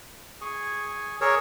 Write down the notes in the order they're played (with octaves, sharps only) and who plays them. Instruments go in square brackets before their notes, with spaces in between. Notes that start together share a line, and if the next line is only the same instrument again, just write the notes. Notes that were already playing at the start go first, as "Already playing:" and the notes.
[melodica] G#4 G#5 C#6
[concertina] G#4 A#4 C#5 [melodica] D5 E6